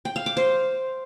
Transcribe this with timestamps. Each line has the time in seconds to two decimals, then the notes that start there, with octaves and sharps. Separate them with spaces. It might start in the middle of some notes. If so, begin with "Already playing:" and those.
0.05 G5
0.16 F5
0.26 D6
0.37 C5